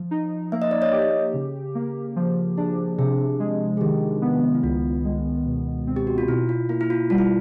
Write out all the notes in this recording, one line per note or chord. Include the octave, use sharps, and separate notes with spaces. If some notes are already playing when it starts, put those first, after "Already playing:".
Already playing: F3
D#4
A#3 E5
D#5
D5
C#5 D#5
G4
C#3
A#3
F3
D4 G#4
C3 G#4
G#3
G#4
D#3 G4
B3
E4
C#2 F4
G#3
B2
C4
G4
F#4
F4
B2 E4
F4
A#3 E4
E4
F4
G3 F4
E4